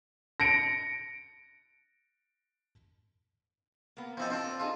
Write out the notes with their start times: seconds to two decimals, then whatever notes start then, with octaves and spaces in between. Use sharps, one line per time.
0.40 A#6 C#7 D7
3.97 A#3 B3
4.17 F3 B3 C4 E4 A4 D#5
4.30 C4 D4 F4 A4
4.60 D#4 F4 G#4 A4